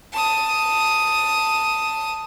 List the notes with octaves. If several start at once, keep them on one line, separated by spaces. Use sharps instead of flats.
A5 D#6